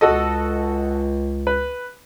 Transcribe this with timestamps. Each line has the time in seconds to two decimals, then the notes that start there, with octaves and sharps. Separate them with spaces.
0.01 C#2 F#4 A4 D#5
1.47 B4